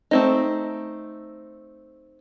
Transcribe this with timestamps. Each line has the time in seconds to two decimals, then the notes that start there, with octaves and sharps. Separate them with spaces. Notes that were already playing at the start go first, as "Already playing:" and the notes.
0.11 A3 C4 D#4